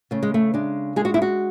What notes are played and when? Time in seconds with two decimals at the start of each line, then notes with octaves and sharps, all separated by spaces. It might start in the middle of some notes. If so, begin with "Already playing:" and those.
0.11 C#3 A3
0.23 G#3
0.34 A3
0.54 G#3 D4
0.96 G#3 G#4
1.05 F#4
1.14 E4
1.22 F#4